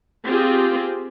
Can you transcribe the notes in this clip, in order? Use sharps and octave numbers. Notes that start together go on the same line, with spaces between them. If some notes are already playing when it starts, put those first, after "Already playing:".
C4 F4 G4 G#4